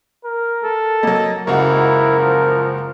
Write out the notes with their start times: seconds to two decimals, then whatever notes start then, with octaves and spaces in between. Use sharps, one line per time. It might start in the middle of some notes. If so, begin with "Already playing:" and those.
0.25 A#4
0.64 A4
1.03 F#3 A#3 D#5
1.47 F#1 C#2 E4 F#4 A#4
2.20 F3